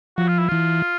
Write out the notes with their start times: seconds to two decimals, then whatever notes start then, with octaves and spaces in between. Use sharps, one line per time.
0.17 F3 F#4
0.28 F4
0.38 E4
0.48 E3 F4